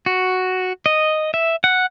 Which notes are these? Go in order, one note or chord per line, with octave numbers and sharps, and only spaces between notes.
F#4
D#5
E5
F#5